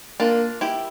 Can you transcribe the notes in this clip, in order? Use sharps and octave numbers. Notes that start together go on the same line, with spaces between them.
A#3 D4 F4
E4 G4